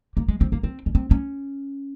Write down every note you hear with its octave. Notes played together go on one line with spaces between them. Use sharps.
A#3
G#3
C4
A#3
C4
C#4
C4
C#4